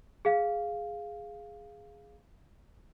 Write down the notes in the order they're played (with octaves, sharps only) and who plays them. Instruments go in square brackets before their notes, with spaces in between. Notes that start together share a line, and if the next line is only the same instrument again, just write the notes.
[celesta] G#4 F5